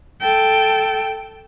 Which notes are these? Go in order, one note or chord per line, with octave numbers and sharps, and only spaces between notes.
A4 G5